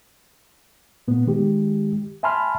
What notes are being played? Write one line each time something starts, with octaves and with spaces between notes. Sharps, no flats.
A#2 B3
D#3 G#3 G4
E5 G#5 A5 B5 C6 F6